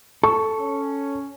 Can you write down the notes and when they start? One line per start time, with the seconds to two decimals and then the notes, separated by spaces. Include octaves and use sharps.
0.23 A4 C#6
0.60 C#4